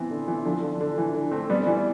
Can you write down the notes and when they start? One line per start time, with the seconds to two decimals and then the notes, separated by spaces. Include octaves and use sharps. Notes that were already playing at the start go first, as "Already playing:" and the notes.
Already playing: E3 B3 C4
0.10 D3
0.28 E3
0.45 D3 F3
0.62 D3
0.81 D3
0.98 E3
1.14 D3
1.32 A3 C4
1.50 G3 B3
1.67 E3 G3